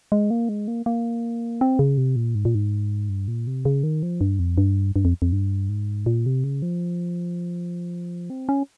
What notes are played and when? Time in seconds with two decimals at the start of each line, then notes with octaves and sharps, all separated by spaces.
0.12 G#3
0.31 A#3
0.49 G#3
0.68 A#3
0.86 A#3
1.61 C4
1.79 C#3
1.98 C3
2.16 A#2
2.35 G#2
2.45 A#2
2.55 G#2
3.09 G2
3.28 A#2
3.47 C3
3.65 C#3
3.83 D#3
4.03 F3
4.21 G2
4.39 F2
4.58 G2
4.96 G2
5.05 F2
5.22 F2
5.32 G2
5.69 G#2
6.06 A#2
6.26 C3
6.44 C#3
6.62 F3
8.30 C4
8.49 C#4